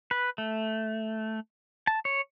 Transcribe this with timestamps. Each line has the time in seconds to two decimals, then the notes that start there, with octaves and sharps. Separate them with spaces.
0.11 B4
0.38 A3
1.87 A5
2.05 C#5